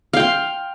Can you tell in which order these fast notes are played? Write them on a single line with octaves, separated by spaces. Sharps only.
F5 G5 C6